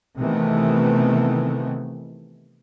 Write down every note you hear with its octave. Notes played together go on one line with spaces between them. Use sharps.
C3 D#3 E3 A3 B3